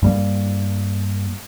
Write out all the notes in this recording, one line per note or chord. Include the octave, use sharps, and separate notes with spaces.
G2 G3 A#3